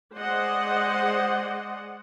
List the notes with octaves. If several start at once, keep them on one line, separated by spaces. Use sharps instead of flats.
G#3 G#4 C5 D5 D#5 F#5